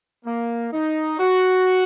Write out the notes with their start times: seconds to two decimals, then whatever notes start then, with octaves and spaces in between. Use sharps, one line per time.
0.25 A#3
0.73 D#4
1.19 F#4